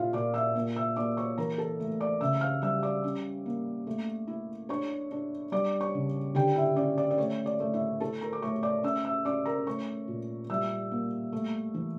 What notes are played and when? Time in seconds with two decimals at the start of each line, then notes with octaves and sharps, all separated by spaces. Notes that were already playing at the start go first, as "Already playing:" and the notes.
Already playing: A#2 E4 F4 E5 F5
0.13 A#2 D5 D6
0.34 E5 E6
0.55 A#3
0.76 E5 E6
0.96 A#3 D5 D6
1.17 C#5 C#6
1.38 E3 A#4 A#5
1.58 A4 A5
1.80 A3
2.00 D5 D6
2.21 C#3 E5 E6
2.41 F5 F6
2.62 G3 E5 E6
2.83 D5 D6
3.04 C#4
3.46 A#3
3.87 A3
4.27 E4
4.69 D4 C#5 C#6
5.11 D4
5.52 G3 D5 D6
5.80 C#5 C#6
5.94 C#3
6.35 D3 G4 G5
6.56 E4 E5
6.76 C#4 D5
6.98 D5
7.11 D5
7.18 A3 C#5
7.46 D5
7.60 A3
7.74 E4 E5
8.00 E4 A4 A5
8.21 A#4 A#5
8.33 D6
8.42 A3 C#5 C#6
8.63 D5 D6
8.83 C#4 E5 E6
9.05 E5 E6
9.25 C#4 D5 D6
9.45 A#4 A#5
9.67 A3 C#5 C#6
10.08 A#2
10.50 G3 E5 E6
10.91 A#3
11.33 A3
11.74 E3